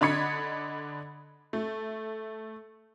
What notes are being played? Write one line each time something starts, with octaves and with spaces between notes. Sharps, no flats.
D3 D4 D#5 B5 G#6 C#7
A3